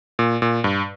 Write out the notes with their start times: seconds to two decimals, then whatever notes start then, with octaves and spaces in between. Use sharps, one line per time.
0.19 A#2
0.42 A#2
0.64 G2